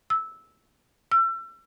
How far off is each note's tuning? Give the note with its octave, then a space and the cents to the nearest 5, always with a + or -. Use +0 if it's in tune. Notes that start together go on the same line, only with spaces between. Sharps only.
E6 -10
E6 +35